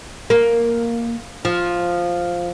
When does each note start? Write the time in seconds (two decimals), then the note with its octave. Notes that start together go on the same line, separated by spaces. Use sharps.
0.30 A#3
1.45 F3